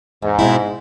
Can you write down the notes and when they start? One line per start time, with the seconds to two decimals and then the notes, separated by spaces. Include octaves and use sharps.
0.22 E2 G#2
0.39 B2 G#3 C4 E4